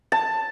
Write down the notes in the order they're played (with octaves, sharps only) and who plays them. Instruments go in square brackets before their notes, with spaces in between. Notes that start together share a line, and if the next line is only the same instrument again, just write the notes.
[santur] A5